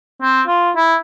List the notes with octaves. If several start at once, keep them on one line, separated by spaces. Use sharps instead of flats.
C4
F4
E4